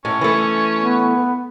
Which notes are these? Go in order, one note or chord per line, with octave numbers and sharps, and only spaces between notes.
A2 C#4
E3 A3
B3